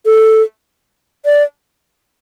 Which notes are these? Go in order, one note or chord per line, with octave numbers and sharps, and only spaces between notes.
A4
D5